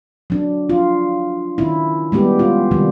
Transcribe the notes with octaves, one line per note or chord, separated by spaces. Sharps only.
F#3 D4
F4
D#3 C#4 E4
G3 G#3 B3 G4
C#4 F4
C3 D#3 G3